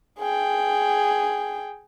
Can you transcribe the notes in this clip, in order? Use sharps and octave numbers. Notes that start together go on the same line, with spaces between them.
G#4 G5